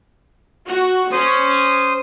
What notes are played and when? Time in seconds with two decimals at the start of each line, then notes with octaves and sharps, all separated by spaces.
0.67 F#4
1.12 C#4 C5 D#6